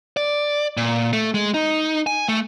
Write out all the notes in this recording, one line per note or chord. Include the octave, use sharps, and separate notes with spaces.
D5
A#2
A3
G#3
D#4
G#5
A3